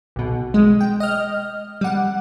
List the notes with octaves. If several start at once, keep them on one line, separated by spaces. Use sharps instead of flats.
B1 B2
G#3
G5
D#5 F6
G3 F#5